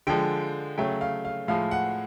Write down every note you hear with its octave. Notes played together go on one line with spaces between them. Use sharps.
D3 F3 G#3 G5
C#3 F#3 A3 G5
F5
F5
A2 F3 G#3 F5
F#5